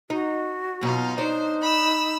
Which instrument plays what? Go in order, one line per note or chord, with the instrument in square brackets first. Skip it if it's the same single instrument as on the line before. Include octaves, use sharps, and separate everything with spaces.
[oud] D#4 [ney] F#4
[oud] F#2 B2 [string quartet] D#4 F4
[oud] D4 C#5 [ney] D#4 [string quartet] C5
[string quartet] B5 E6